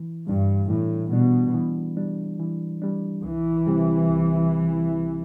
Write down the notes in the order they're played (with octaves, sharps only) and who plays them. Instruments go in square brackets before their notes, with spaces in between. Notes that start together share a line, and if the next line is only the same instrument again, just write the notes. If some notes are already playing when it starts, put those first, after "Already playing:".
Already playing: [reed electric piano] E3
[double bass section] G2 [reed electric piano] G3 D4
[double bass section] A2 [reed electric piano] E3
[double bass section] B2 [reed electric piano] G3 D4
[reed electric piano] E3
G3 D4
E3
G3 D4
[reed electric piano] C2 [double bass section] E3
[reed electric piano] C3 G3 C4 G4
C2